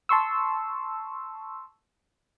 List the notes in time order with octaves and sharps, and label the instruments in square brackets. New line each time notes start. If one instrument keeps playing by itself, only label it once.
[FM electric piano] A5 C6 C#6 E6